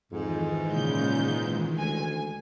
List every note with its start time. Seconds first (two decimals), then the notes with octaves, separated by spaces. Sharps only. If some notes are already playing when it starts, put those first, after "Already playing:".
0.12 F2 G#2 D#3 E3 G#3
0.73 A#2 C#3 G6
1.77 D2 G#5